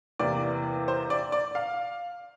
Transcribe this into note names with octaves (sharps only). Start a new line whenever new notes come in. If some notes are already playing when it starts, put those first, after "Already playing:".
E2 C3 E3 A#3 D5
C5
D5
D5
F5